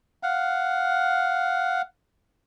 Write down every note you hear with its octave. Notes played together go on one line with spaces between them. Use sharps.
F5 F#5